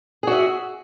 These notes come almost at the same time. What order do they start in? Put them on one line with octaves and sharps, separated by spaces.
G#4 F#4 E5